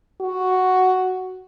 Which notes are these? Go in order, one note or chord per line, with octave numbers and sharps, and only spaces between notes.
F#4